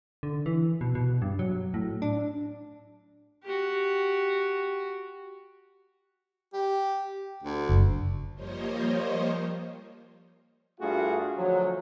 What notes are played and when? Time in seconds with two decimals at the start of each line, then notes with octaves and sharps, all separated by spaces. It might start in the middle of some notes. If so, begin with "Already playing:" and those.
0.23 D3
0.46 E3
0.81 B2
0.95 B2
1.22 G2
1.39 F#3
1.74 A2
2.02 D4
3.43 F#4 G4
6.53 G4
7.43 D2
7.69 F#1
8.35 F3 G3 A#3 C5 C#5 D#5
10.80 G2 A3 F4 F#4 G#4
11.36 D2 F3 F#3